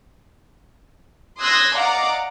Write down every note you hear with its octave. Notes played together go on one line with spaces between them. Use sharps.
C6 D#6 E6 F#6 G#6 A#6
D5 D#5 F5 F#5 A#5 D6